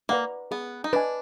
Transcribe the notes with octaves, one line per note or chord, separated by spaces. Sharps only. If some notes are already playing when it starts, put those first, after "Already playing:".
A#3 B4 D5 F#5 A#5
B3 G#4
D#4
D4 B4 D#5 G#5